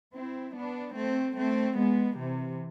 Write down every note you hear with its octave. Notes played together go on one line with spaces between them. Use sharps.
C4 E4
B3 D4
A3 C4
A3 C4
G#3 B3
C3 E3